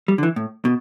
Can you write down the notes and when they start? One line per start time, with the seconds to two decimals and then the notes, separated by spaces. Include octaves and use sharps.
0.08 G3
0.18 D3
0.23 E3
0.36 A2
0.65 B2